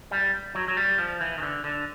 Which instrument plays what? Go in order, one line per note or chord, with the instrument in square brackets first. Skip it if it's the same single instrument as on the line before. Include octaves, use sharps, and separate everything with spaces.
[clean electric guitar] G3
F#3
F#3
G3
F3
E3
D#3
D3
D3